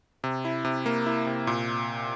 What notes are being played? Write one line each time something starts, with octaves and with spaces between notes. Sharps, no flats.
C3
E4
C3
A#3
E4
C3
A#2